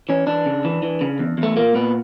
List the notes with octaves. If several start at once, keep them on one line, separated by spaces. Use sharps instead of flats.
E3 C#4
E3 D4
C#3
E3
E3
C#3
E2
E2
A3
A#2 A#3
A#2 B3